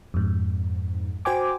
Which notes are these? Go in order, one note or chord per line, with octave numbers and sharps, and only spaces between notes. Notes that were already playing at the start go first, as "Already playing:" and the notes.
F2 G#2
F#4 C5 G5 G#5 D6